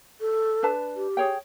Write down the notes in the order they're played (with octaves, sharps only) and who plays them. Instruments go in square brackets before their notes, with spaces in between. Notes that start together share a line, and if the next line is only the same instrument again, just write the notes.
[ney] A4
[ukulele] D4 B4 A5
[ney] G4
[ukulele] G#4 C#5 G5